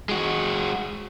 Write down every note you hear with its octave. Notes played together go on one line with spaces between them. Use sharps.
G#3 F#4